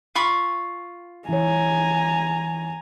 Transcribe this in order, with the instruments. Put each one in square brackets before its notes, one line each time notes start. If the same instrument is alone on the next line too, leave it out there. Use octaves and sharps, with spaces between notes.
[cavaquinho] F4 B5 C#6
[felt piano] E3 C#5 [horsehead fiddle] G#5 A#5